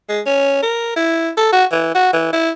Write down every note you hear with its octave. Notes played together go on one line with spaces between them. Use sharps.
G#3
C#4
A#4
E4
A4
F#4
E3
F#4
E3
E4